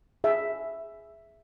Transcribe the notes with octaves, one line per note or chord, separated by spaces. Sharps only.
G#4 E5